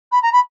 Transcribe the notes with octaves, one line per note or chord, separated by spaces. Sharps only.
B5
A#5
B5